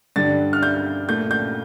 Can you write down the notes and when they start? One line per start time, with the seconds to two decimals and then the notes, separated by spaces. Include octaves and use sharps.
0.16 G2 D3 G3 A6
0.53 F6
0.63 G6
1.09 A#2 A3 G6
1.31 G6